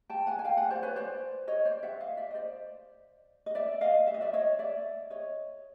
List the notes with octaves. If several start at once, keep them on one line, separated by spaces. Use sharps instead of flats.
G5 A5
F#5 G#5
G#5
F5 G5
F#5 G#5
C5 D5
B4 C#5
C5 D5
C#5 D#5
C5 D5
E5 F#5
D#5 F5
D5 E5
D#5
C5 D5
D#5
D5 E5
D#5 F5
E5
D#5
D5 E5
C#5 D#5
D5 E5
C#5 D#5